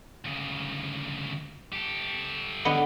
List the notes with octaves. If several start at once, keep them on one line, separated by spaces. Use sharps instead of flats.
D2 C#3
G4 A4
D3 B3 D#5